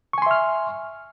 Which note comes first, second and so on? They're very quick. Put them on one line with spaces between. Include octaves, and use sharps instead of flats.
C#6 G#5 C6 E5 F6